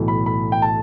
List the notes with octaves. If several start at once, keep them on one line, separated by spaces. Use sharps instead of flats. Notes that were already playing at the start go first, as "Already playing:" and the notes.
Already playing: B1 A2 E3
B5
B5
G5
A5